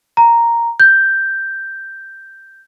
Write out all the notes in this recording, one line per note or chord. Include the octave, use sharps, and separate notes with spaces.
A#5
G6